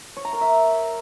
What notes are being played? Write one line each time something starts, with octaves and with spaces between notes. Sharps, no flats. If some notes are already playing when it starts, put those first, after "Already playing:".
C#5
A#5
A#4
E5